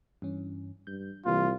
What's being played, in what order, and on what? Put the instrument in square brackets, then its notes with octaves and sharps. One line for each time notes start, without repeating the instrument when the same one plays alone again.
[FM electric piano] G2 E3 C#4
[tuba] G2 [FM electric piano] G6
[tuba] C2 [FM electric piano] E3 G3 A#3 [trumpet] F4